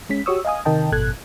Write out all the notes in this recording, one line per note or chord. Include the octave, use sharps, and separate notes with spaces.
G#3 C#4 B6
F#4 G4 C#5 C#6 D#6 E6
D#5 F5 G#5 D#6
C3 D#3 A#4 D#5 G5 A5
G#1 F#2 B2 A4 F#6 G#6